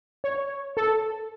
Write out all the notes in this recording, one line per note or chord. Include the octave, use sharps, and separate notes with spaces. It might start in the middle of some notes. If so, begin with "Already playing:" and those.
C#5
A4